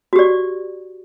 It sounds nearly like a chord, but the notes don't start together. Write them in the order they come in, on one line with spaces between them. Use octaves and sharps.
F#4 G4 D5